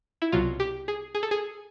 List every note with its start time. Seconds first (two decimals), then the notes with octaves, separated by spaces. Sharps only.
0.22 E4
0.32 C2 B2 F#3 F4
0.60 G4
0.88 G#4
1.15 G#4
1.23 A4
1.31 G#4